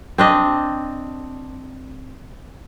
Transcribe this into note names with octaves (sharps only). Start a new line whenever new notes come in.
C4 D4 D#5